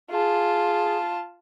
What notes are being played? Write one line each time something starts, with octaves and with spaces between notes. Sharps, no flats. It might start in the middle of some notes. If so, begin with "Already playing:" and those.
F4 G#4 A5